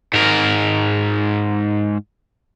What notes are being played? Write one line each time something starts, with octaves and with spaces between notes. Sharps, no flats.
G#2 A#4